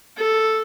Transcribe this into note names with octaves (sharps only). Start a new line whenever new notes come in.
A4